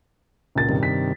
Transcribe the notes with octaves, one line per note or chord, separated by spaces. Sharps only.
C#2 A#2 A6
G2 C3 D#3
B6